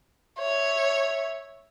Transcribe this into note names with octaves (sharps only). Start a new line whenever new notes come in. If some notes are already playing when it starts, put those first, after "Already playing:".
C#5 E5